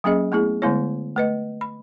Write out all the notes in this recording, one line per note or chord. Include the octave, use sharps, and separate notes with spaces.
F#3 A#3 C#4 G#4 D#5
A3 B3 E4 G#4
D3 G#3 A3 B3 E4 C#5
A3 B4 D#5
B5